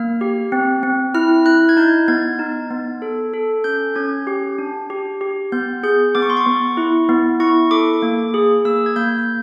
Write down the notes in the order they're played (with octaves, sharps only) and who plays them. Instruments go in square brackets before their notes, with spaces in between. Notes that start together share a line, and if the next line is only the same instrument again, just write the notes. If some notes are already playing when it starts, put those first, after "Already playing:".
Already playing: [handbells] A#3 F6
G4
C4
C4
E4 F6
E4 F#6
G#6
D#4 G6
B3 G#6
D#4
B3
A4
A4
C#4 G6
C#4 G#6
G4
D4
G4
G4
B3 G6
G#4 G6
B3 D6
C#6
C6
C#6
B3
E4
B3
E4 C#6
A4 D6
A#3
G#4
A#3 E6
G#6
A#3 G6
G6